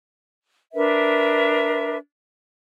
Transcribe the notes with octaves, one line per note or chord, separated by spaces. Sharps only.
D4 A#4 B4 E5